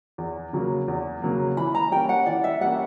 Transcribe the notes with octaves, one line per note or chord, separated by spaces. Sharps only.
E2
C#3 F#3 A#3
E2
C#3 F#3 A#3
E3 B5
A#5
G3 A#3 C#4 G5
F#5
E3 D5
E5
G3 A#3 C#4 F#5